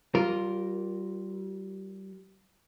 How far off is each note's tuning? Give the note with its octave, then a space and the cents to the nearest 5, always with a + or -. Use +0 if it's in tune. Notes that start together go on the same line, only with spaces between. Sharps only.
G3 -30 F4 +0 A#4 +0